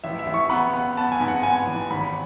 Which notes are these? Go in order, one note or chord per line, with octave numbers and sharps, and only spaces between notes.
A1 E5
E5
A1
C#6
B3 B5
B3
B3 A5
G#5
G#2
F#5
B3 G#5
A1
G#1 B5